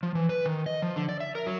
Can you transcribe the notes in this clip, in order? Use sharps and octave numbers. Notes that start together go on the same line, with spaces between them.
F3
E3
B4
D#3
D#5
F3
D3
D5
E5
A#4
F#3